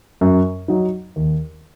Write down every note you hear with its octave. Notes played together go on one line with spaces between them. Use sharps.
F#2
F#3 D#4
D#2